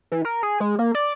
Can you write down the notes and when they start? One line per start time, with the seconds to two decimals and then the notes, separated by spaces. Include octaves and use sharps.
0.12 E3
0.25 A#4
0.43 G#4
0.60 G#3
0.79 A#3
0.95 D5